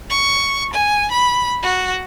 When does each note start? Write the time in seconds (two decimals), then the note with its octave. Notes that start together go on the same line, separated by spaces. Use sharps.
0.10 C#6
0.73 G#5
1.11 B5
1.63 F#4